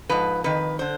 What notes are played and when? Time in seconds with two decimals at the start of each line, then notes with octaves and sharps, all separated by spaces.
0.09 G#2 F3 B4
0.44 F2 D#3 B4
0.79 D3 C5